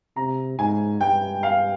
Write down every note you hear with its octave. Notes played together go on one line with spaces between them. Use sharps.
C3 A#5
G#2 G#5
G2 G5
F5